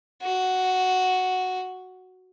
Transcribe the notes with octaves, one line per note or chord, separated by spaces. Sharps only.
F#4